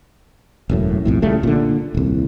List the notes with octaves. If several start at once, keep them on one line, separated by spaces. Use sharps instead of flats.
E1 F#2 A2
B1 F2 A2
C#2 C#3 G3 A3
A#2 D3
D#1 C2